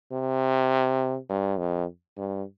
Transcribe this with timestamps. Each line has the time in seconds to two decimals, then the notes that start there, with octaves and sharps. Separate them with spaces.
0.12 C3
1.29 G2
1.59 F2
2.17 G2